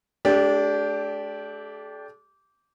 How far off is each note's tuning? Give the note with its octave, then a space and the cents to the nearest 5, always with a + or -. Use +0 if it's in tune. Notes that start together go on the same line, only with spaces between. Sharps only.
A3 -40 D4 -20 G4 +0